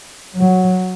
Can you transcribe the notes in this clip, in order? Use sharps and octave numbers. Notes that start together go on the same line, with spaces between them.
F#3